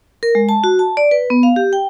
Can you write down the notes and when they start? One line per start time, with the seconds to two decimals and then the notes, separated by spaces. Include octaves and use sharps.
0.23 A#4
0.35 G#3
0.49 A5
0.64 F#4
0.79 A5
0.97 D5
1.11 B4
1.30 B3
1.43 F5
1.56 G4
1.73 G5